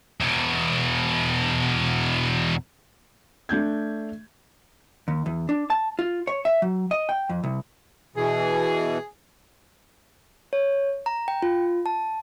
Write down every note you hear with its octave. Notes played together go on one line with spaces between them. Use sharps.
E2 B2
A3 D4 G6 G#6
D#2
E2
D4
A5
F4
C#5
E5
F#3
D#5
G5
F2
C2
B2 E3 G#4
C#5
A#5
G5
F4
A5